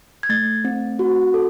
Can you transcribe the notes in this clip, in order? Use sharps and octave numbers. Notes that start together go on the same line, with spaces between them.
G#6
A3 A6
C4
F#4
A4